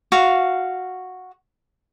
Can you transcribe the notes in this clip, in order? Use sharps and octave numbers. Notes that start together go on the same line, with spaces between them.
F#4 F5